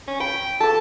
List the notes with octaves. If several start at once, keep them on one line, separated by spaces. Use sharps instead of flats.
C#4
G5 B5
A4 A5 D6